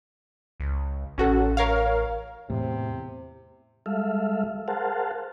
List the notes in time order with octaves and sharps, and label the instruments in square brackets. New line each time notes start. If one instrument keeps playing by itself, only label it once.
[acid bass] C#2
[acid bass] A1 [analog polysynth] C#4 F#4 A4
[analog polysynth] A#4 C#5 F5
[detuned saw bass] E2 [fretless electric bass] A2 [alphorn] C3
[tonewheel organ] G3 G#3 A4 E5 F5
G#4 A#4 C5 F5 F#5 A5